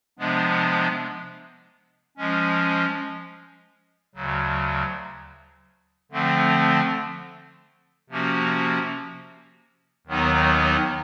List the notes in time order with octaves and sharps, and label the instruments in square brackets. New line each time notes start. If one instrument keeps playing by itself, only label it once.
[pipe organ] C3 F3 G#3 B3 D4
F3 G#3 C#4
D2 C#3 F#3
D3 F3 A3 C4
C3 F3 A#3 C#4 F#4
D#2 D#3 F#3 B3 D#4